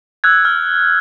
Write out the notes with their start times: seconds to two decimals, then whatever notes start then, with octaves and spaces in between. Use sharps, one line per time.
0.24 E6 F#6 G#6
0.45 F6